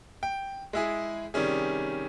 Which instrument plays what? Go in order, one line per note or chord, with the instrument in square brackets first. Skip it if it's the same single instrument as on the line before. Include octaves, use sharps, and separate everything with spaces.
[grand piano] G5
G#3 E4 G#4
C3 D#3 G3 C#4 G#4